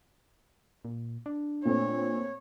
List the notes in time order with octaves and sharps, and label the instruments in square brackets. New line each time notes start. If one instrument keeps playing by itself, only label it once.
[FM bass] A#2
D4
[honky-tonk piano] A#2 A3 C4 [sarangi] C#5